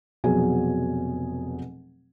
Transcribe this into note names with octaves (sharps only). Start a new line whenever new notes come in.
F1 B2 F#3 G#4 G#5